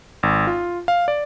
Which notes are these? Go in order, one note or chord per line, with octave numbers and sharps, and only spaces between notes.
G#1
F4
F5
D5